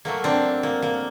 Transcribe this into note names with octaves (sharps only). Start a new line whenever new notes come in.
A2 F#3 A3 A#3
C4 D4
A#3
A#3